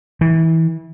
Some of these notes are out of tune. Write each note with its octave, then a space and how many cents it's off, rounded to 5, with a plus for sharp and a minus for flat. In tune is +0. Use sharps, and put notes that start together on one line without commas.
E3 -25